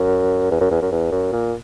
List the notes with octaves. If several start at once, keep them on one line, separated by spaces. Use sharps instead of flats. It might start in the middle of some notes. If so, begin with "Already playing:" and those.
Already playing: F#2
E2
F#2
E2
F#2
E2
F#2
A#2